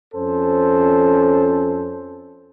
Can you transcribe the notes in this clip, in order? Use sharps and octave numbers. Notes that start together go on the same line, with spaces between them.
F2 C#4 A4 C5